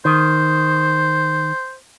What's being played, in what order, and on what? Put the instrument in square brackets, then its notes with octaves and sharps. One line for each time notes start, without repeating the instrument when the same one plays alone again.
[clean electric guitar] D#3 [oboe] C5